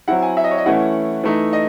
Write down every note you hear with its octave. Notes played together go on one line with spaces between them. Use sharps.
F#3 C4 E4 F#5
G#5
E5
D#5
C#5
D#5
E3 A3 C#4 E4 F#5
E3 A3 D#4
D#5